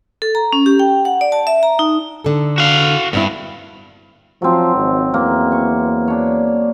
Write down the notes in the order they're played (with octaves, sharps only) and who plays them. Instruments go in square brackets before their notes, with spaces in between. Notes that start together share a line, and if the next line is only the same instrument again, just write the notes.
[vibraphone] A4
A#5
C#4
G4
G5
F#5
D5
A5
E5
A#5
D#4
[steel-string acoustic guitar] D3 A4
[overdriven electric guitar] F#4 F5
[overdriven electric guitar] G2 [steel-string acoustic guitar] B3 C4 E4
[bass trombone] F3 [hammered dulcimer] F#3 C4
[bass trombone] G#1
[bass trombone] E2 [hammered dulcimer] A#3
[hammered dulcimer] C#6
D4 C#5